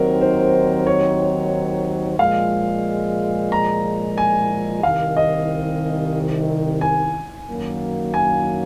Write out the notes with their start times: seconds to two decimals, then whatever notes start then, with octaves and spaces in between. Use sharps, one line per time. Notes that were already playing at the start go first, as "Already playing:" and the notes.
Already playing: D#2 D#3 F#3 C4 D#4 A#4
0.21 C5
0.87 C#5
2.19 A#2 F3 G#3 F5
3.52 A#5
4.18 G#5
4.83 C2 C3 D#3 F5
5.17 D#5
6.81 G#5
7.48 F#2 D#3 F#3 A#3
8.14 G#5